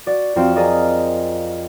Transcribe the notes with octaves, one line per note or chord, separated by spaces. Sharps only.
F#4 D5
F2 C4 F4 F#4 G5 E7
G#4 A#4 D5 D#5 F5